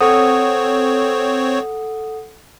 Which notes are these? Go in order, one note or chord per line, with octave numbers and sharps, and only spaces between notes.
C4 A4 C#5 F#5 D#6